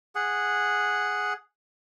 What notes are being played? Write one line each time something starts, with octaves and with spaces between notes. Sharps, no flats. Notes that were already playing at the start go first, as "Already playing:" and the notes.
G#4 F#5